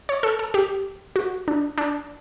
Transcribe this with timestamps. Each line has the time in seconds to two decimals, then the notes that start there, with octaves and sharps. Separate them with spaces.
0.09 C#5
0.23 A4
0.39 A4
0.54 G4
1.16 F#4
1.48 D4
1.78 D4